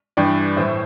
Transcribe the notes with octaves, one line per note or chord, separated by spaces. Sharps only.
G2 E3 G3 D5 G5
A2 E3 A3 C5 E5